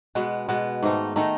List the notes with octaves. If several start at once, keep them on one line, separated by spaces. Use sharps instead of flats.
B2 G#3 B3
B2 G#3 B3
G#2 D#3 A3 D#4
D#3 A3 D#4